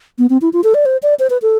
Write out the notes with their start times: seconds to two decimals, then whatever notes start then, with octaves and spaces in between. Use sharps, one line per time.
0.19 B3
0.30 C4
0.42 E4
0.53 F4
0.64 A4
0.74 D5
0.86 C5
1.03 D5
1.19 C5
1.30 B4
1.42 A4